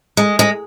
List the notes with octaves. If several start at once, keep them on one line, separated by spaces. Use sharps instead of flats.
G#3
G#3